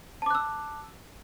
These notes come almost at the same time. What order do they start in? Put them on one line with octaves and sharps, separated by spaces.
A5 D6 F#6 E6